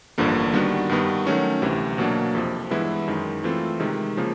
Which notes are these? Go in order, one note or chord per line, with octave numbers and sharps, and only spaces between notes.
A1 G2 D3 F3 A#3
D#3 G3 B3 D4 F#4
G2 D#3 G3 B3
D#3 F#3 A3 C#4 F#4
D2 C3 E3
B2 F#3 A#3 D4
F2 C3 F3
G2 E3 G#3 B3 E4
F#2 D#3 G#3
E3 A3 C4 F4 A4
C3 D#3 G#3
C#3 F3 A#3